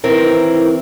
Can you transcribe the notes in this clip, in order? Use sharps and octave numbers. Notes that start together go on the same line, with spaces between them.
D#3 E3 C4 E4 A#4